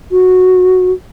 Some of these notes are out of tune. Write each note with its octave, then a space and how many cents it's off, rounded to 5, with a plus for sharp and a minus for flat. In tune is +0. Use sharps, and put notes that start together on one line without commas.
F#4 -5